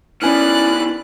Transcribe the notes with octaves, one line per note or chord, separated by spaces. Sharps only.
D#3 B3 C#4 E4 D5 G#5 F6 F#6